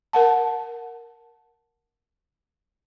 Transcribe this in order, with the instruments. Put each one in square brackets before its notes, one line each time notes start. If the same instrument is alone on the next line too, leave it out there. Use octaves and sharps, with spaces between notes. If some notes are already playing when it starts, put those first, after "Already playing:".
[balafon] A#4 F#5 A5